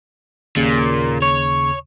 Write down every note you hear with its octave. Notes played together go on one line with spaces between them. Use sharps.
D#2 A#2 C#3
C#5